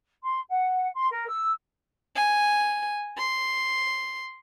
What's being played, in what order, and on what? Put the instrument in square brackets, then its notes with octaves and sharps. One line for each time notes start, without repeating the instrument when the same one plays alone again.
[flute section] C6
F#5
C6
A#4
E6
[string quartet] G#5
C6